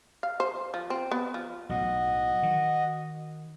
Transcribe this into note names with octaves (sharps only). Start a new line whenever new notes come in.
F5
C5
F3
C4
B3
F3
B1 A2 F#4 D#5
D#3